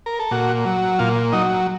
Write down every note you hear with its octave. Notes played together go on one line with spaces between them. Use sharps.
A#4
A4
A#2 F#4
F#3
A#2 F4
F#3 D#4